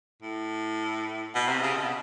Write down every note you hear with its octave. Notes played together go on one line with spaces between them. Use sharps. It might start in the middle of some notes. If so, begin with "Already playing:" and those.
A2
B2
C3
C#3
B2